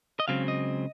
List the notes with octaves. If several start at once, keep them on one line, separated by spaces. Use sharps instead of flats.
D#5
C#2 C#3 F#3 C4 F5
D#5